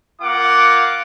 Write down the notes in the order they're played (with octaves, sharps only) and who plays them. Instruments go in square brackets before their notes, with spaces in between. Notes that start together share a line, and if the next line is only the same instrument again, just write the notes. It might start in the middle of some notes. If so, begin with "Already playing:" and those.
[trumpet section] A#3 F4 F#5 D6